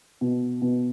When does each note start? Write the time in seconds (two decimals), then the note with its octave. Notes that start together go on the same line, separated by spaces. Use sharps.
0.21 B2
0.62 B2